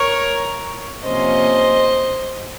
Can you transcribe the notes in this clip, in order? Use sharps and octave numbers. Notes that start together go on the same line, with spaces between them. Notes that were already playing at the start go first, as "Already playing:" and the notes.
Already playing: A#4 C#5
C3 F3 A#3 C#4 C5 D#5